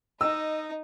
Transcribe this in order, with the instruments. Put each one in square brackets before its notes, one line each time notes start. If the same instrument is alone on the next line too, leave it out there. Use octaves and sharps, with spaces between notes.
[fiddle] D#4 [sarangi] D#5 [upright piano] E6